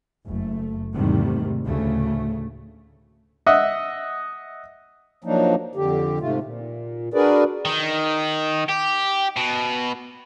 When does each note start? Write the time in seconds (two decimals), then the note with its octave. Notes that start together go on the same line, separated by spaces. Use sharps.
0.25 F#1 A3
0.96 E2 G#2 C3 D#3 G3 A3
1.66 D2 A2 C#3 A3
3.46 D#5 E5 F#5
5.24 F3 F#3 A#3 D4 D#4
5.75 F2 D3 G4
6.20 G#2 C3 A3 F4
6.43 A#2
7.14 D4 F#4 G#4 A#4 B4 D5
7.65 D#3
8.69 G4
9.37 B2